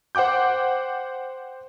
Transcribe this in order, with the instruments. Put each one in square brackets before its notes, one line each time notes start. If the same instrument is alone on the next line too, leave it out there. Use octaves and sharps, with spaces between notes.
[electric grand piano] C5 F#5 G5 D6 G6